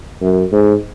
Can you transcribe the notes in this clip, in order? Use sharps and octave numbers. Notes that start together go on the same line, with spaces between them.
F#2
G#2